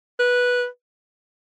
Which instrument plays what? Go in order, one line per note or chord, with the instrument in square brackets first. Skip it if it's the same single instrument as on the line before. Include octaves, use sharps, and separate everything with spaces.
[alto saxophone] B4